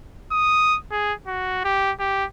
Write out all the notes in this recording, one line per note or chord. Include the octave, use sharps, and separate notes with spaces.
D#6
G#4
F#4
G4
G4